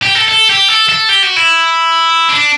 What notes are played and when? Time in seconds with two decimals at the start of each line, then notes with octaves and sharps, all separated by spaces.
0.03 G4
0.15 A4
0.28 A4
0.49 G4
0.68 A4
0.89 A4
1.09 G4
1.23 F#4
1.36 E4
2.29 D4